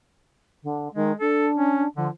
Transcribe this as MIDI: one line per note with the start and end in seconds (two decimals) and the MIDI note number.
0.63 0.88 50
0.95 1.12 51
0.95 1.12 56
1.20 1.87 62
1.20 1.48 69
1.57 1.84 61
1.96 2.08 50
1.96 2.09 53